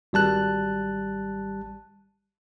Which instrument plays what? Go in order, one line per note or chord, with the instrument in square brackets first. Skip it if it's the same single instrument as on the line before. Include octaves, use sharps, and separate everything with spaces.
[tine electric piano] G#1 G3 A5 F#6